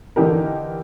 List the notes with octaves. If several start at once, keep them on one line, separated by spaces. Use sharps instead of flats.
D3 E3 D#4 G4 A#4